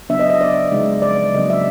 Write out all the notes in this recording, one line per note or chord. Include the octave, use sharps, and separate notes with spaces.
C#3 F#3 B3 D4 E5
D#5
D#5
D5
C#3 F3 G#3 C4 D#4
D5
C#3 F#3 A#3 D4 D#5
E5